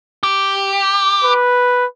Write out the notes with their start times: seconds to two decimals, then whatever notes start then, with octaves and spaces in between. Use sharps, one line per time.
0.23 G4
1.24 B4